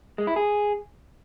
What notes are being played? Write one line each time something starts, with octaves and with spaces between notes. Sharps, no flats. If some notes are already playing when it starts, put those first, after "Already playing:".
G#3
E4
G#4